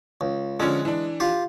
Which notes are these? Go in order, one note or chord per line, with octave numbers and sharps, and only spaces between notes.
C#2
D3 F3 G#3 C#4
E3 D4
F4 G4